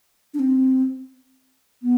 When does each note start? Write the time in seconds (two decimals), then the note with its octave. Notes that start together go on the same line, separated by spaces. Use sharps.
0.34 D4
0.39 C4
1.83 B3